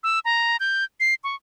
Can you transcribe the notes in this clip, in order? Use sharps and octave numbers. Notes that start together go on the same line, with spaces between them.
E6
A#5
G6
C7
C#6